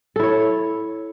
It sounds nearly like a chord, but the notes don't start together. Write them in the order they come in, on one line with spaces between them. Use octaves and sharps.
A4 E4 C#5